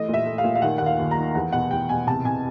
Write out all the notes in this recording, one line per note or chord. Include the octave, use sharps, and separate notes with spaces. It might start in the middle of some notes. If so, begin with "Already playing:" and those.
Already playing: E3 A3 D#5
A#2
E5
A3
F5
A#2
F5
D#3 F#5
D#2 F#5
F5
D#2
A#5
D#3
E2 F#5
B2 F#5
E2 G5
B2 G#5
C3 A5
C3 G#5